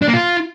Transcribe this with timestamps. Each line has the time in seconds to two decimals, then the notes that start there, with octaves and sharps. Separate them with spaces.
0.02 D4
0.08 A#3
0.14 F4